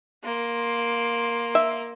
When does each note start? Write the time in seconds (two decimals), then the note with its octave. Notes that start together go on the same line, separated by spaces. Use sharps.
0.24 A#3 C6
1.55 E5